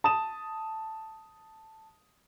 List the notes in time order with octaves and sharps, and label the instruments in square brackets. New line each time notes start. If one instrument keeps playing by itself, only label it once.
[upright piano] A5 D#6 E7